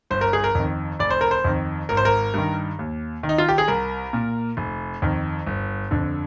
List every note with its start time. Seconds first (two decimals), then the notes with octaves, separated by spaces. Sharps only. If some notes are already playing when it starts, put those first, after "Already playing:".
0.10 G1 C5
0.21 A#4
0.33 G#4
0.44 A#4
0.55 F2 D#3
0.99 F1 D5
1.10 C5
1.21 A#4
1.31 C5
1.44 F2 D#3
1.89 G#1 A#4
1.97 C5
2.05 A#4
2.34 G2 D#3
2.79 D#2
3.23 D#3
3.29 D#4
3.38 F4
3.48 G4
3.58 G#4
3.68 C2 A#4
4.13 A#2
4.57 F1
5.02 F2 D#3
5.46 G1
5.91 F2 D3